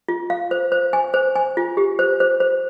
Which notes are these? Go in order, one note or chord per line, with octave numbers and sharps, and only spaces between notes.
F4
F5
C5
C5
G#5
C5
G#5
F4
G4
C5
C5
C5